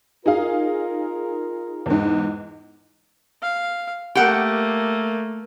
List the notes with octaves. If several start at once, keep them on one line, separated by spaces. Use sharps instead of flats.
D#4 F4 G#4 A#4 F5
E2 G#2
F5
A3 A#3 G4 F#5